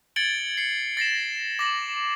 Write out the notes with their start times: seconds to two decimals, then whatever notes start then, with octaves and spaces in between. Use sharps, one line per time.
0.16 G#6 A6 C#7 D7 F#7 G7
0.57 C7 C#7
0.97 A6 A#6 C7 E7
1.59 D6 A#6 F#7